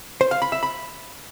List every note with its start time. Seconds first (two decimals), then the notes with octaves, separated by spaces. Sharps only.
0.21 C5
0.31 F5
0.42 B5
0.52 E5
0.63 B5